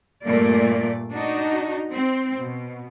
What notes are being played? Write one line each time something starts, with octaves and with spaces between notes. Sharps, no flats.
G2 A#2 A3 A#3 D5
D4 D#4 F#4
C4
B2